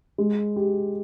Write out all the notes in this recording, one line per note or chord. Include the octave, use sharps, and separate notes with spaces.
G#3
G4